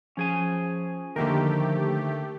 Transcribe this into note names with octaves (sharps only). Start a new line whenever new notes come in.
F3 C#4 G#4 G#5
D3 D#3 A3 A#3 G4 A#4